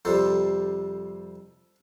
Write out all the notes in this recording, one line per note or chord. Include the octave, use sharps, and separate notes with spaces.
F2 C3 G3 A4 C5